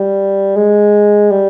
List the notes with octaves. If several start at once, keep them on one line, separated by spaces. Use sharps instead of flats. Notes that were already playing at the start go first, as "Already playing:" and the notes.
Already playing: G3
G#3
G3